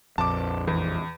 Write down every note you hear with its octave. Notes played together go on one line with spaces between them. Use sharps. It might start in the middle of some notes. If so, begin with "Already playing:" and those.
A#1 F2 A5 D6
E2